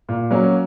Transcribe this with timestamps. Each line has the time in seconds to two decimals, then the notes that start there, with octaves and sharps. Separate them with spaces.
0.09 A#2
0.31 F#3 A#3 C#4